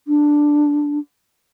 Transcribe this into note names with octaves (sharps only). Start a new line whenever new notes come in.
D4